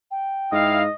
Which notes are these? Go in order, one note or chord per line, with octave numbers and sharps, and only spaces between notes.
G5
G#2 E4 D#5 F5